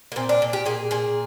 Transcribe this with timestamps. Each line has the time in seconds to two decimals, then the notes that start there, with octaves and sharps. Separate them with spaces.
0.12 A#3
0.16 A#2 C4
0.29 D4
0.42 A#2
0.53 G4
0.66 A#2 G#4
0.91 A#2 G#4